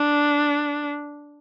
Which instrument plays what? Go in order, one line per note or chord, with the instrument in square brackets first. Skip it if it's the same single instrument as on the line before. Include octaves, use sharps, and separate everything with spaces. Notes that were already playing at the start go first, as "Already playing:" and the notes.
Already playing: [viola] D4